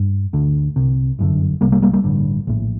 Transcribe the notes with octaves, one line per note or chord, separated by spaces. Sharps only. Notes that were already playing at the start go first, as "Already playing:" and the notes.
Already playing: G2
D2 D3
C2 C3
G1 F#2 D3
C2 C3 G3 A#3
G3 A#3
G3 A#3
G3 A#3
A1 G2 D3
A#1 A2